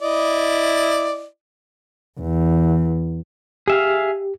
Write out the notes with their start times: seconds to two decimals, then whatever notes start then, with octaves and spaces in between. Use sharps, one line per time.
0.02 E4 D5 D#5
2.19 E2
3.68 G4 G#4 E5 F5